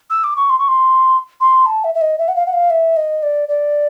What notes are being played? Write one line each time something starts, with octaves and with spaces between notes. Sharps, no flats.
E6
D6
C#6
C6
C#6
C6
C6
A5
E5
E5
D#5
E5
F#5
F5
F#5
F5
E5
D#5
D5
D5